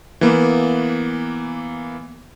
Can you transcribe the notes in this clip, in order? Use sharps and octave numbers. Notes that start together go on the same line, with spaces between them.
E3 A#3 B3